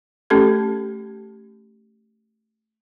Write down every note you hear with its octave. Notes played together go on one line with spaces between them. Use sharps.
A3 C#4 G4 A4 A5 G#6